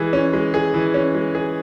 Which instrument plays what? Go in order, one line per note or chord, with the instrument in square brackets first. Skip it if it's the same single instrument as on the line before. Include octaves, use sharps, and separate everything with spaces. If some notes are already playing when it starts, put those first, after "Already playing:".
Already playing: [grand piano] E3 G#3 G#4
C#4
G#3
G#4
E3
C#4
G#3
G#4